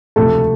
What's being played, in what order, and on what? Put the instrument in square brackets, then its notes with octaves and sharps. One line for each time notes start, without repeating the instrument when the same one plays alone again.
[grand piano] E1 D2 C3 F3 A3 A4